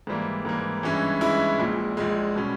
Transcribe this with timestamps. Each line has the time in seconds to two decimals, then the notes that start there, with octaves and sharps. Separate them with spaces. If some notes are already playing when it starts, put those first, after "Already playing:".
0.07 G#2 E3 G3 A#3
0.45 G#2 E3 G3 A#3
0.83 G2 E3 G#3 C#4 E4
1.21 G2 E3 G#3 C#4 E4
1.59 A#1 A#2 G#3
1.97 A#1 A#2 G#3
2.35 B2 G3 C#4